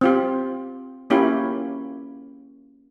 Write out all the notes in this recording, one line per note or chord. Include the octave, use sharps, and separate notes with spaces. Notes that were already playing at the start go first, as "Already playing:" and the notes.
C4 F4 G4
A#3 C#4 E4 F4 G4